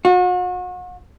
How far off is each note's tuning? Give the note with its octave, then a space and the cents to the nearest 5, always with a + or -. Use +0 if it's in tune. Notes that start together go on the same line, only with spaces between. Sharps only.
F#4 -40